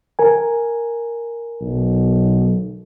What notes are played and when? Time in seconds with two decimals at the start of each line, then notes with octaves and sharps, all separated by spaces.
0.19 A#4 G#5
1.61 B1